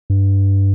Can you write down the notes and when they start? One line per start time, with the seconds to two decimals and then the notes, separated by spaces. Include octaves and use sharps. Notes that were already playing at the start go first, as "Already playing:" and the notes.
0.10 G2